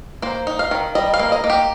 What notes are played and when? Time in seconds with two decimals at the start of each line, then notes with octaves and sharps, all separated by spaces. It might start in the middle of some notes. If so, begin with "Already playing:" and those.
0.22 A#3 C5
0.47 D#4
0.59 F5
0.71 D#3
0.95 G3 D#5
1.14 F5
1.19 A#3
1.32 D#5
1.44 A#3
1.50 G4